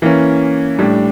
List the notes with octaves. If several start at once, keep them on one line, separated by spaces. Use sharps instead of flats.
E3 A#3 C#4
A2 G3 D4